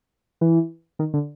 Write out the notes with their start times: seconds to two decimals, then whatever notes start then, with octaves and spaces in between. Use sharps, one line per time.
0.41 E3
0.99 D#3
1.14 D3